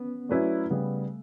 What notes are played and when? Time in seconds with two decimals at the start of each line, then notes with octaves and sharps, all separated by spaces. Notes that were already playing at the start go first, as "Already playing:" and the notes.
Already playing: B3 C#4
0.29 F#3 A3 C#4 E4 B4 D5
0.70 C#3 G3 B3